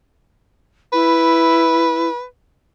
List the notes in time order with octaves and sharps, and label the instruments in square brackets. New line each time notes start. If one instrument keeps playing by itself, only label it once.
[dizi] E4 [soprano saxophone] B4